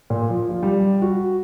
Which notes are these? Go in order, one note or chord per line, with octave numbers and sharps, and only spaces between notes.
A#2
F3
F4
G3
F#4